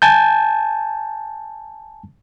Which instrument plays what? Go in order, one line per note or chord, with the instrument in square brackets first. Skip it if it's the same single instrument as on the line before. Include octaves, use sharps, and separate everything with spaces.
[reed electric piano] G#5 A5 G6